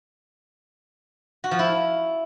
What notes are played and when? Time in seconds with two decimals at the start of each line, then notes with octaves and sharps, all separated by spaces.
1.44 F#4
1.51 F3
1.59 E4